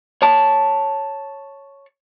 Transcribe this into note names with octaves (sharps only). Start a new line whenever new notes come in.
C#5 A5